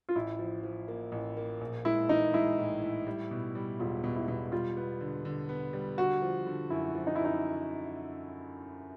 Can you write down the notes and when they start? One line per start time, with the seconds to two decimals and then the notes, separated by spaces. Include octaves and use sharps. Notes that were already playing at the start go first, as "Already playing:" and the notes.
0.09 F4
0.16 A1 E4
0.39 F3
0.63 F3
0.88 A#3
1.12 A1
1.37 A#3
1.61 A#1
1.85 G#3 E4
2.09 E3 D#4
2.34 G#3 E4
2.58 A2
2.82 A2
3.07 G3
3.31 B2
3.55 G3
3.79 E1 F4
4.04 B2
4.16 E4
4.28 B2
4.52 G3 F4
4.77 B3
5.01 D3
5.25 D3
5.49 B3
5.73 G3
5.98 D3 F#4
6.22 F3
6.47 D3
6.70 F#2 E4
6.95 F3
7.07 D#4
7.15 F#2 E4
7.25 D#4